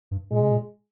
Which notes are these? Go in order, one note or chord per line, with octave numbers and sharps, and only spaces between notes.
G2
A#2 G#3
C3
A#2